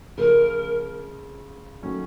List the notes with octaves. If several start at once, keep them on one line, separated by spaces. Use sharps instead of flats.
C#3 F3 A3 A#4
D#3 F#3 A3 C#4